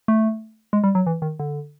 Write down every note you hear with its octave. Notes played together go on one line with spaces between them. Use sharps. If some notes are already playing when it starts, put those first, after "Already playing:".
A3
G#3
G3
F#3
E3
D#3
D3